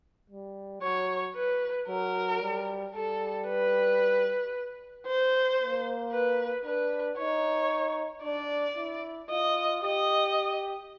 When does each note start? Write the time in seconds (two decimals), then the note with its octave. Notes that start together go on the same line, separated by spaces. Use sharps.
0.30 G3
0.82 F#3 C#5
1.35 B4
1.88 F#3 A#4
2.42 G3
2.95 G3 A4
3.48 B4
5.06 C5
5.59 A#3
6.12 B4
6.65 D4 B4
7.18 D#4 C#5
8.24 D4 D5
8.77 E4
9.30 F4 D#5
9.83 G4 D#5